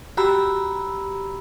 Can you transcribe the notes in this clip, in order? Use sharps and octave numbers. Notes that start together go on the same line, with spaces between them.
F#4 G4 A#5 B5 E6